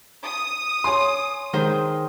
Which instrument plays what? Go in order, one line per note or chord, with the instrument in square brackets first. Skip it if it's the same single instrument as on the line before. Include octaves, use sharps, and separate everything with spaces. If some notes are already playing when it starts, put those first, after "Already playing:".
[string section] D#6
[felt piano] C#5 G#5 C6
[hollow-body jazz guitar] D#3 G#3 C5